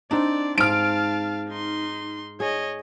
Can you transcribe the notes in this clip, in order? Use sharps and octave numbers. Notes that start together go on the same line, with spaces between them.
C4 D4 D#4 D5
G#2 F5 A5 F6 D7
D#4 C6
G#4 C#5 D#5